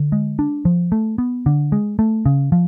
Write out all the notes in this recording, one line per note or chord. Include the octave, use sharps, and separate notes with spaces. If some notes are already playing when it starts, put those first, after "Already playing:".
Already playing: D3
G#3
D4
F3
A3
B3
D3
G#3
A3
C#3
F3